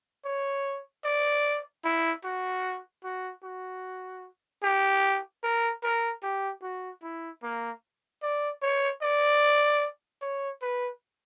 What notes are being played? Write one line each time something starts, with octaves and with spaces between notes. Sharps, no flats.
C#5
D5
E4
F#4
F#4
F#4
G4
A#4
A#4
G4
F#4
E4
A#3
D5
C#5
D5
C#5
B4